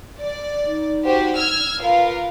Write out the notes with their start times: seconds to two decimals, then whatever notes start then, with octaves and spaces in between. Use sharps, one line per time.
0.19 D5
0.66 D#4
1.04 F#4 G4 C5
1.36 E6 F6 G#6
1.82 F4 A#4 B4 F5